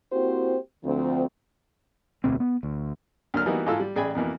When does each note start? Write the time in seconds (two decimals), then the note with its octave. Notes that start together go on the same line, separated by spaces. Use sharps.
0.12 A#3 C4 E4 F#4 G4 C5
0.84 D2 F3 C4
2.24 E1 D2 B2 C4
2.40 B3
2.63 D2
3.34 D2 F#3 A#3 F6
3.46 E3 G3 A#3 B3 D#4 F#4
3.67 G#2 E4 F4 A4 E6
3.80 G3
3.96 A1 G#4 D5 G5 G#5 B5
4.15 F2 B2 E3 A#3